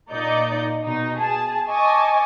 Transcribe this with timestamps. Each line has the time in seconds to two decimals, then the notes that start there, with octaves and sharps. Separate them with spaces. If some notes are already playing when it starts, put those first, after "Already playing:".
0.10 A#2 D#4 D5 D#5 G6 C#7
0.83 B2 D#4
1.19 G#4 A5
1.69 D#5 G#5 A5 C#6 D6